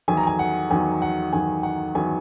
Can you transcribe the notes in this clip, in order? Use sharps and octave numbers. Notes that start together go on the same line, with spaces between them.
E2 D#3 F#3 G#5
A#5
G#5
F#5
E2 D#3 F#3 G#5
F#5
E2 D#3 F#3 G#5
F#5
E2 D#3 F#3 G#5